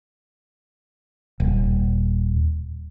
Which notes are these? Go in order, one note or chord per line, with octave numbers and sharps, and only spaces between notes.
D#1